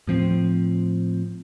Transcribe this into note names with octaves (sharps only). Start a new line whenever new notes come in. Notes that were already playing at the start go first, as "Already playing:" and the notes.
A2 F3 C4